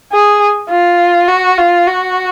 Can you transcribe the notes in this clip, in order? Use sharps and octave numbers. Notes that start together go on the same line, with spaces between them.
G#4
F4
F#4
F4
F#4